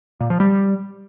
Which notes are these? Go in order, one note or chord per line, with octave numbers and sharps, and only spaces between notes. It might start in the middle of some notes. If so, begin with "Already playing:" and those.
A#2
F3
G3